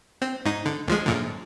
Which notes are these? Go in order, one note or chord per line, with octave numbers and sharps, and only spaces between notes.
C4
G#2 D#4
D3
D2 F3 G#3
F#2 A#2 D3